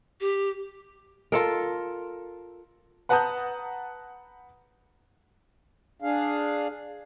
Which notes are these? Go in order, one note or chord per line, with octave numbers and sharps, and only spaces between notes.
G4
F4 A4 A#4
B4 F#5 A5 A#5 D#6 G6
D4 G#4 F5